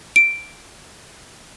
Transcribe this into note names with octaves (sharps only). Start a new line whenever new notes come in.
D7